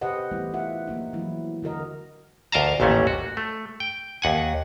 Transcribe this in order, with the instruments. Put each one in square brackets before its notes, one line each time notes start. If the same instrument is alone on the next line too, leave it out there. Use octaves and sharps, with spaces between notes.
[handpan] C3 G4 B4 C5 D#5 F#5
E3 G3 A3 B3 E4
F4 E5 F#5
F3 A#3 D#4
E3 F#3 G#3 E4
D3 F#4 A#4 D#5
[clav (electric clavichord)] D2 A#4 D#5 F5 A5 A#5
A1 D#2 A#2 A3 C#4
F#4
A3
G5
D#2 F#5 G#5